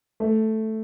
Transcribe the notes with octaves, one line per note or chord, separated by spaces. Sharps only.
A3